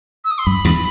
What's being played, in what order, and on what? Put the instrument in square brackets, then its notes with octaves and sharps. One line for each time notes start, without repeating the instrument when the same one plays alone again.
[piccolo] E6
D#6
C6
[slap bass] F#2 [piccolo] B5
[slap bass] E2 G2